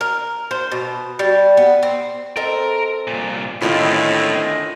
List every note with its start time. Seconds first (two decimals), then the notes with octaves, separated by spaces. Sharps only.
0.01 A#4
0.51 C5
0.72 B2
1.19 G3
1.57 B3
1.83 C4
2.36 C4 A4 A#4 D#5
3.07 C2 A#2
3.62 A2 D3 D#3 C4 C#4 F4 D#5